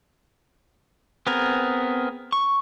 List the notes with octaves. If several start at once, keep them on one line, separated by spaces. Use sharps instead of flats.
B3 C4 G#4 A#4
C#6